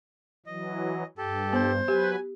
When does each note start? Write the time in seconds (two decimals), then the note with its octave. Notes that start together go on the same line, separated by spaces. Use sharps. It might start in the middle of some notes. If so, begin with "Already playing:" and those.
0.46 E3 F#3 D#5
1.18 G2 G4 A4
1.53 B3 C5
1.88 F#3 G4 B4 G#5